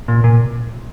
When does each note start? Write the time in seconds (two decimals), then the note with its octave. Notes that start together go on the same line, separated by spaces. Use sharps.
0.08 A#2
0.24 A#2